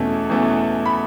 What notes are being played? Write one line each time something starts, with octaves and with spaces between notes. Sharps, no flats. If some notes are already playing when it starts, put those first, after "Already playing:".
Already playing: E2 B2 A3 C#4
E2 B2 A3 C#4
B5